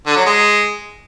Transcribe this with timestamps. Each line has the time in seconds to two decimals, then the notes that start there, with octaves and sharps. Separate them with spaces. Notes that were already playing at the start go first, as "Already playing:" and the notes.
0.06 D3
0.16 F#3
0.26 G#3